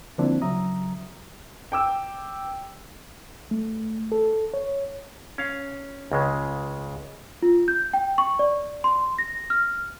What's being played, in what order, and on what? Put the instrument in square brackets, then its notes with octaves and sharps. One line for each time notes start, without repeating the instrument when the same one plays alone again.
[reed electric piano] D3 F3 A#3 C4 D4 E4
C#3 F#3 E5 A#5 D#6
[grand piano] G5 D6 E6
[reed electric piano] A3
A4
C#5
[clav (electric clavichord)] C#4 F5
C#2 C#3 G#3
[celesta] F4
G6
G5
C#6
D5
C6
A#6
F6